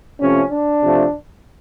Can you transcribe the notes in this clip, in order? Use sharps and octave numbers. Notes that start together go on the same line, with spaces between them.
C3 F3 A3 C#4
D4
C3 F3 A3